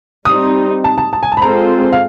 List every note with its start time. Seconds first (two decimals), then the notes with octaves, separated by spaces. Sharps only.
0.25 G3 C4 D#4 D#6
0.84 A5
0.98 A5
1.13 A5
1.23 G#5
1.32 A5
1.37 B5
1.42 G#3 C4 F4 A4 C5 A#5
1.92 F5